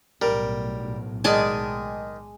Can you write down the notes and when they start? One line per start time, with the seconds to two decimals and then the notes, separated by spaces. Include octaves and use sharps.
0.22 B1 A2 G3 A#4
1.24 D#3 G#3 D5 G#5 A5